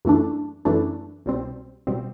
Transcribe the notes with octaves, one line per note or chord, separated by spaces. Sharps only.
F#2 E3 A3 D4
F#2 E3 A3 D4
C2 B2 G3 C4
B2 G3 C4